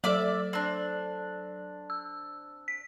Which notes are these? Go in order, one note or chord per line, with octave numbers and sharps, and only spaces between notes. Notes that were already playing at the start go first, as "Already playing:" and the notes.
F#3 A4 D5 E5 D6
C4 D4
E6
B6